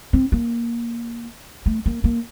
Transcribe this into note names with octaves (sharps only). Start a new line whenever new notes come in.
C4
A#3
A3
A#3
A#3